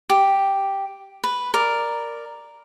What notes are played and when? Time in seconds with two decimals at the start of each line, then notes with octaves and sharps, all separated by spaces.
0.09 G4
1.24 B4
1.54 A#4 D5